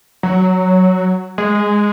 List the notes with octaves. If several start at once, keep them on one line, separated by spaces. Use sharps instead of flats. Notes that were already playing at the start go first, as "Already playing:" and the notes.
F#3
G#3